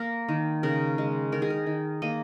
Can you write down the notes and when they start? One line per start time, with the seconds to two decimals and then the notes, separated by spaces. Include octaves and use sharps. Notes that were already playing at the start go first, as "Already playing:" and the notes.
Already playing: A#3 A#4
0.29 D#3
0.63 C#3 A#4
0.98 G#3
1.32 D#3 A#4
1.42 G#4
1.50 A#4
1.66 D#3
2.02 A#3 D#5